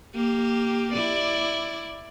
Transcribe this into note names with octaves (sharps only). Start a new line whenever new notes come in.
A#3 G4
E4 D5